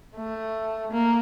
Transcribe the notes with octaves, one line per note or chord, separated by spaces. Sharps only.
A3
A#3